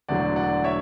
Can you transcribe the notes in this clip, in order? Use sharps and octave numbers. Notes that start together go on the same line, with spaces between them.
E1 D2 D3 F#3 D5 F#5
D5 F#5
C#5 E5